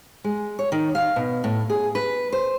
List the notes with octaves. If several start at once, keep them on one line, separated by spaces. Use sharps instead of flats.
G#3
C#5
D#3
F5
B2
A2
G#4
B4
C5